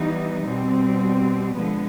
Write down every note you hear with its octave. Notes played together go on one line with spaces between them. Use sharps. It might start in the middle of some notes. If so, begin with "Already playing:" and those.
Already playing: E3 G3 B3 D#4
B2 G3 C4
D3 F3 G#3 B3